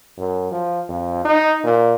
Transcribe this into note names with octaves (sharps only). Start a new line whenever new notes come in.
F#2
F3
F2
D#4
A#2